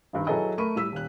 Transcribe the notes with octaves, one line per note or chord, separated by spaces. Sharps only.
G#1 G2 D#3
F#3 E4 G#4 A4 B4 D#5
A3 A#4 B5 C#6 D#7
A2 G3 E6 B6
D#1 F#6